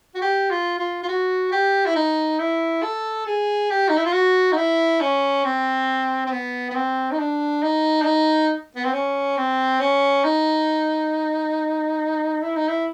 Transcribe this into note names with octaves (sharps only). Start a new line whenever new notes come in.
F#4
G4
F4
F4
F4
F#4
G4
E4
D#4
E4
A4
G#4
G4
D#4
E4
F4
F#4
D#4
E4
C#4
C4
C4
B3
B3
C4
D#4
D4
D#4
D4
D#4
B3
C4
C#4
C4
C#4
D#4
E4
D#4
E4